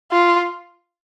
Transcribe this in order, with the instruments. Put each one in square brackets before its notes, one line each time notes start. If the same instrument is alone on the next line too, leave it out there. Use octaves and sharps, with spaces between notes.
[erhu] F4